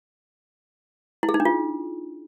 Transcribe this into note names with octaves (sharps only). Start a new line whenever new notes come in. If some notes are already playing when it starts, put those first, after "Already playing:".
E4
G#4
D#4
D4
F4